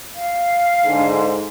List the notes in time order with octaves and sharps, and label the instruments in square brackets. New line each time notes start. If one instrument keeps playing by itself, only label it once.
[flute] F5
[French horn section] G#2 D3